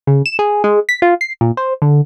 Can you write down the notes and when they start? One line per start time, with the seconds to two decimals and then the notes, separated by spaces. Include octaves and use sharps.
0.07 C#3
0.26 E7
0.39 G#4
0.64 G#3
0.89 B6
1.02 F4
1.21 C7
1.41 A#2
1.57 C5
1.82 D3